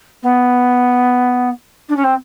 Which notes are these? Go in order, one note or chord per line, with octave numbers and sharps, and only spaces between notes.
B3
D4
C#4
C4